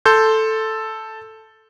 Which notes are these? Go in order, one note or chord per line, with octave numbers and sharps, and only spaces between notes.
A4 C6 G6